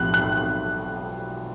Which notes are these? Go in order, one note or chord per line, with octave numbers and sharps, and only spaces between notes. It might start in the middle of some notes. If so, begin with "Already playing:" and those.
Already playing: B1 A2 F3 F#6
F#6